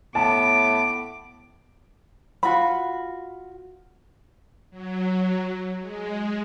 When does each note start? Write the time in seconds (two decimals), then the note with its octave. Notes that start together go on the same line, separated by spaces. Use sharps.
0.15 A2 B3 A5 D6
2.43 F4 F#4 B5
4.70 F#3
5.80 G#3